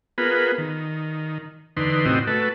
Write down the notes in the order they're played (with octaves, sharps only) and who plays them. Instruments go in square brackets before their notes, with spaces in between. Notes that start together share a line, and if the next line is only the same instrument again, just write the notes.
[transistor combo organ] B3 F4 G#4 A#4 B4
D#3
E2 D3 D#4 B4 C6
A2 C3 C4 E4 F#4 D#5
A3 F#4 A4 B4